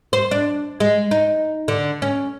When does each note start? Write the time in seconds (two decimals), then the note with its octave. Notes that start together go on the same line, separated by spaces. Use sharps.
0.13 C5
0.31 D4
0.80 G#3
1.11 D#4
1.68 D3
2.02 C#4